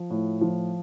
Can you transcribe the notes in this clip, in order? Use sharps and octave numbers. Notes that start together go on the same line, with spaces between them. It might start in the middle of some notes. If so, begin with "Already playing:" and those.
Already playing: F3
A2
F3